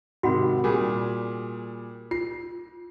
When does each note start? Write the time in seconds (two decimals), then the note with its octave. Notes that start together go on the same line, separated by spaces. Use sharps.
0.23 G#2 C3 D#3 F#4 F#5 B5
0.64 A#2 G3 G#4
2.11 F4 C7